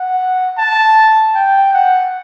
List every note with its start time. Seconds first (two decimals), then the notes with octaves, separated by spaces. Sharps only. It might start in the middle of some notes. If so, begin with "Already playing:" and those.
Already playing: F#5
0.58 A5
1.35 G5
1.73 F#5